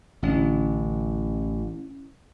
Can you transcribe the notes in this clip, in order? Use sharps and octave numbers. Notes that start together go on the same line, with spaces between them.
A1 D3 C#4 E4